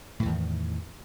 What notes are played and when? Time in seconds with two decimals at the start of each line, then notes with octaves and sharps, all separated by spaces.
0.20 A2
0.23 E3
0.25 E2
0.28 D#3